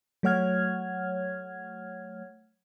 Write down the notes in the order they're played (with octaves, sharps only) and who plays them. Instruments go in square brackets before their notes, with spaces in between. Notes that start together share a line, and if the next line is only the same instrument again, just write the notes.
[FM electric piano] F#3 A3 C#5 F#5 F6 G#6